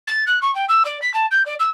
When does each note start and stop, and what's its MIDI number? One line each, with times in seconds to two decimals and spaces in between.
0.07 0.23 93
0.26 0.39 90
0.41 0.53 85
0.54 0.65 79
0.68 0.82 88
0.85 1.00 74
1.01 1.12 95
1.13 1.26 81
1.30 1.42 91
1.45 1.54 74
1.59 1.69 88